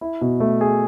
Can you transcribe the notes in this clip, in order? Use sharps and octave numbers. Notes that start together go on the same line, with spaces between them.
E4
B2
A3
G#4